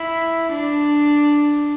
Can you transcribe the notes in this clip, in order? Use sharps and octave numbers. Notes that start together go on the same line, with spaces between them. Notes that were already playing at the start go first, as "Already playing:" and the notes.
Already playing: E4
D4